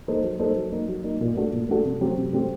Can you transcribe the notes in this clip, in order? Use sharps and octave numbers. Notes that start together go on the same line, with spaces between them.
A#3 D#4 A4 C5
F#3
A#3 D#4 A4 C5
F#3
A#3 D#4
F#3
A#3 D#4
A#2
A3 D4 F#4 A4
A#2
A3 D4 F#4 A4
C3
F#3 A3 C4 G4
C3
F#3 A3 C4 G4